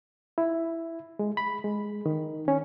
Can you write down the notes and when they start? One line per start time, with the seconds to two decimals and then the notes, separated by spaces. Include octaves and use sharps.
0.38 E4
1.19 G#3
1.37 B5
1.64 G#3
2.06 D#3
2.48 C#4